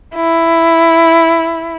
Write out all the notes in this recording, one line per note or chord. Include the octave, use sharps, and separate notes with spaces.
E4